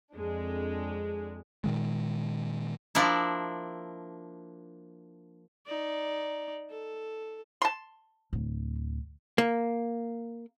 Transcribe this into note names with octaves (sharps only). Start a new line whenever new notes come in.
F2 G#3 D4
A#2 D#3 G#3
F3 A#3 D4 E4
D#4 D5
A4
A5 C6
D1
A#3